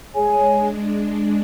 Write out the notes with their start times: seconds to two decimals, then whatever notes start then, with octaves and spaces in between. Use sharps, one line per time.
0.14 G#3 G#4 C#5 G#5
0.52 D4